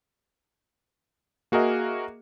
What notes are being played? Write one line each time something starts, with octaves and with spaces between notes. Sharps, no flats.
A#3 F#4 G#4 A#4 D#5 E5